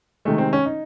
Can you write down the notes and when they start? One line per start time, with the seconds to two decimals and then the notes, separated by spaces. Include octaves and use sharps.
0.25 C3 D#3 G#3 A3
0.38 C4
0.53 C#4
0.66 D#4